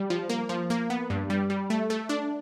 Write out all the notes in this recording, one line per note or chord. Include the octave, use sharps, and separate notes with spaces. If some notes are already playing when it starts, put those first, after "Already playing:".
Already playing: G3
F3
A#3
F3
A#3
B3
G2
G3
G3
A3
A3
D4